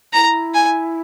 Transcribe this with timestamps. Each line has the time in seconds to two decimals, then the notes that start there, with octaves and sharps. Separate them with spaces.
0.13 E4 A#5
0.54 G#5